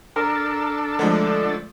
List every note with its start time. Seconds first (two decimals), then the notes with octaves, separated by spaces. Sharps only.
0.16 D4 A4 A#4
0.99 D3 F3 G#3 A3